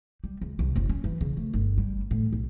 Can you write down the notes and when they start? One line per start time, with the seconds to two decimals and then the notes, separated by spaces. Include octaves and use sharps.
0.24 G3
0.41 C#2
0.59 C2
0.76 F#1
0.89 C#4
1.04 E3
1.21 C#3
1.37 A3
1.53 G1
1.78 G3
2.11 A2
2.33 B1